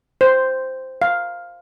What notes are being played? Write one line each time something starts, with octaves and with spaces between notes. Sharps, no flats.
C5
F5